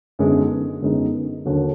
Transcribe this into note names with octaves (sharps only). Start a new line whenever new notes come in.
F#2 D3 G#3 B3 D#4
F#2 D3 G#3 B3 D#4
D#2 D3 F#3